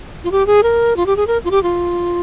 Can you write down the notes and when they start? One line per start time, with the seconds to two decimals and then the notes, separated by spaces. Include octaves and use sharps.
0.24 F4
0.32 G4
0.47 G#4
0.63 A#4
0.97 F4
1.06 G4
1.17 G#4
1.27 A#4
1.45 F4
1.51 G4
1.63 F4